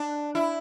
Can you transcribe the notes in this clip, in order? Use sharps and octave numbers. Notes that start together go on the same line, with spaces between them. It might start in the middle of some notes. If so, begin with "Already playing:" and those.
Already playing: D4
E4